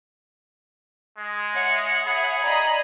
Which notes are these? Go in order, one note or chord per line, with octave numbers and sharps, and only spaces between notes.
G#3
C#5 E5 F#5
G#4 B5
D5 D#5 A#5 B5